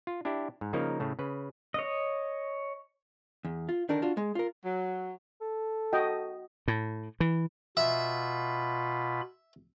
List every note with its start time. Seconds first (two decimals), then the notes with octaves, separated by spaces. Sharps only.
0.07 F4
0.25 D4 E4 G4
0.61 G#2
0.73 C#3 F3 A#3 D#4 A#4
1.00 A2 C#3 A3
1.19 C#3 B4
1.74 C#5 D#5
3.45 E2
3.69 F4
3.89 D3 D#3 D4 D#4 A#4
4.02 D4 F4 F#4
4.17 G#3
4.35 F4 A#4
4.63 F#3
5.41 A4
5.93 F#4 D#5 G5
6.68 A2
7.20 E3
7.77 B2 F4 E5 B5